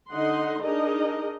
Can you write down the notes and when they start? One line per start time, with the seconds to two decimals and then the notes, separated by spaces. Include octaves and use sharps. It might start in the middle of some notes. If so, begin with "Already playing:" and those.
0.10 D3 D#4 D#5 F#5 C6
0.62 D4 D#4 G#4 A#4 D#5